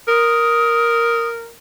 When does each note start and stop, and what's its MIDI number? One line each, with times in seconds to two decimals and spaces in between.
0.08 1.52 70
0.08 1.28 87